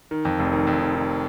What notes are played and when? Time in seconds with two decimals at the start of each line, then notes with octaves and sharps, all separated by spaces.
0.11 D#3
0.25 F2
0.39 F1
0.53 D#3
0.67 F2
0.81 D#3
0.95 D#3